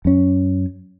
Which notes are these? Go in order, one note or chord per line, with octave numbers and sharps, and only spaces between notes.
F#2 C#4